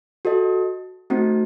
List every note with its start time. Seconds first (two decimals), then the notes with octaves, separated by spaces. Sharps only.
0.25 F#4 A4 D#5
1.10 A3 C4 D#4 F#4